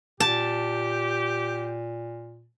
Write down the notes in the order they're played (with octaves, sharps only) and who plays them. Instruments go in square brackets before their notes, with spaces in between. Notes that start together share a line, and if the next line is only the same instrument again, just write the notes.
[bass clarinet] A#2 [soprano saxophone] G4 [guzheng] A5